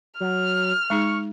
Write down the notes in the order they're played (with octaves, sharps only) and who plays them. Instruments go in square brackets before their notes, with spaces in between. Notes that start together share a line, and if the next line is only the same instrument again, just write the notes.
[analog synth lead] F#3 [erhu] F6
[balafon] G#3 D#4 G#4 [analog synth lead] C#6